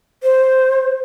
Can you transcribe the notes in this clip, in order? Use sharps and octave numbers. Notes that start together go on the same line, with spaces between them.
C5